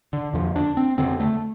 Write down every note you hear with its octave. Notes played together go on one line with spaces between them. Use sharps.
D3
F2 D3 F3
D4
C4
F2 D3 C4
A3